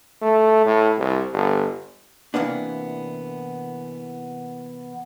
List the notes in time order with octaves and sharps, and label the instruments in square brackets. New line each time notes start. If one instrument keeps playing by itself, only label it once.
[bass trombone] A3
A2
C2
G1
[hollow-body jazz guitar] C3 E3 G3 A#3 B3 D4